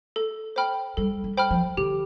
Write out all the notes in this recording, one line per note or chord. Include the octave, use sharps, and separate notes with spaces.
A4
C5 G5 B5 F6
G3 A4
G3
C5 G5 B5 F6
F3
D3 G4